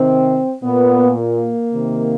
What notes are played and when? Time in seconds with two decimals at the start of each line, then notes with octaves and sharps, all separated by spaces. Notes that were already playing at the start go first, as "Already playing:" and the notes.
Already playing: C3 D#3 C4
0.63 A#2 B3
1.19 A#3
1.73 C3 D#3